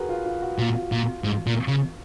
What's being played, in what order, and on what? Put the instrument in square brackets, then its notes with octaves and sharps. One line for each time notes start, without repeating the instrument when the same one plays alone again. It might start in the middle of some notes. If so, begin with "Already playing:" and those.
Already playing: [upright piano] F#4 G#4 A#4 B4
F4
F4
F#4
[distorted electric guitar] A#2 [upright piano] F4
[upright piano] F#4
F4
[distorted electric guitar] A#2 [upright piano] F4
[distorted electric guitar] G#2
A#2
C#3